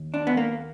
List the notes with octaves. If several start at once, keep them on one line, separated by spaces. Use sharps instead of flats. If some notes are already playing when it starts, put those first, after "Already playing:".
Already playing: D#2
D4
B3
A#3